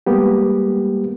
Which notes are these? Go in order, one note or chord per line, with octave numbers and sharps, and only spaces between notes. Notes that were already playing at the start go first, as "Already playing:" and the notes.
G3 G#3 A#3 B3 G4